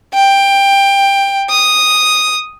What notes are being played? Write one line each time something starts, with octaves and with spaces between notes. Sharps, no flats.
G5
D#6